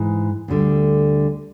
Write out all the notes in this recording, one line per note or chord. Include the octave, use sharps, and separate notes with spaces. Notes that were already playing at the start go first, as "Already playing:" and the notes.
Already playing: G#2 E3 G#3
D2 D3 G3